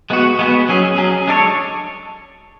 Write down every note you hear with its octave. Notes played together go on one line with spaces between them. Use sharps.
G#3 B3 F#4
G#3 B3 F#4
F#3 C#4 G#4
F#3 C#4 G#4
G#3 D4 A4 C#5